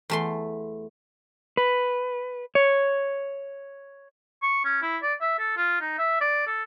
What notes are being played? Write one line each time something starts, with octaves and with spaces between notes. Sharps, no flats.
E2 A3 C6
B4
C#5
C#6
C#4
E4
D5
E5
A4
F4
D#4
E5
D5
A4